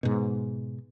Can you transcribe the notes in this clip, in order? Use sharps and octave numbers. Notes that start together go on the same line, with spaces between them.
G#2 B2